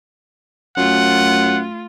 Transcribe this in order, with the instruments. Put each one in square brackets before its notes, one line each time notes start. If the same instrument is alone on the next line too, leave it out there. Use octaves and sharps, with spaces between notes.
[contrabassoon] F#2 [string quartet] A3 F4 [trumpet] F#5